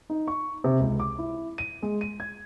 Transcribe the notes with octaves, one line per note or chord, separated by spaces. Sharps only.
D#4
C#6
C3
C#2
D6
E4
D#7
G#3
D#7
G#6